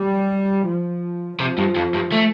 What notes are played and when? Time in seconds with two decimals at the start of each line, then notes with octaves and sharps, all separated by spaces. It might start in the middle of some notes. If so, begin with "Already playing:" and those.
Already playing: G3
0.66 F3
1.39 C3 F3
1.58 G2
1.76 F2
1.94 G2
2.12 A3